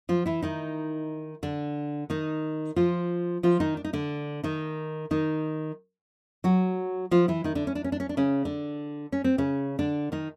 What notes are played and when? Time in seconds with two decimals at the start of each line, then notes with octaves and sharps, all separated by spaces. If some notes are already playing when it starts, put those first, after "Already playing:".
0.09 F3 F4
0.26 E3 E4
0.42 D#3 D#4
1.43 D3 D4
2.10 D#3 D#4
2.76 F3 F4
3.43 F3 F4
3.60 D#3 D#4
3.77 D4
3.84 D#4
3.93 D3 D4
4.44 D#3 D#4
5.11 D#3 D#4
6.44 F#3 F#4
7.11 F3 F4
7.28 E3 E4
7.44 D#3 D#4
7.55 D3 D4
7.67 C#4
7.75 D4
7.84 C#4
7.92 D4
8.00 C#4
8.09 D4
8.17 C#3 C#4
8.45 D3 D4
9.12 C#4
9.24 C4
9.38 C#3 C#4
9.79 D3 D4
10.12 D#3 D#4